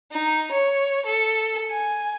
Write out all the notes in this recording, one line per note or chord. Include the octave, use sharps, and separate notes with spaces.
D#4
C#5
A4
G#5